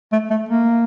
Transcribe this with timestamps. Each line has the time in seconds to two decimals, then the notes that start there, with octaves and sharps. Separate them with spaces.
0.12 A3
0.30 A3
0.49 A#3